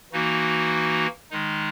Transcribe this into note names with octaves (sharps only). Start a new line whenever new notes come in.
E3 A#3 D#4 F#4
D#3 G#3 D#4